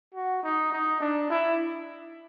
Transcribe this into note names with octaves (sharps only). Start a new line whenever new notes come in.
F#4
D#4
D#4
D4
E4